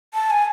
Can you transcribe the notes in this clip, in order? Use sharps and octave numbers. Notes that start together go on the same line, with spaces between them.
A5
G#5